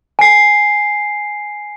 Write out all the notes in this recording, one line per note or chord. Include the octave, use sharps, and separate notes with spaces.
G#5 C7